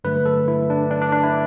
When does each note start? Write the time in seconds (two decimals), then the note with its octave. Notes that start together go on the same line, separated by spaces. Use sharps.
0.04 G2 D3 F#3 A3 B4
0.26 A4
0.48 E4
0.70 D4
0.91 D4
1.02 D4
1.12 D4
1.24 E4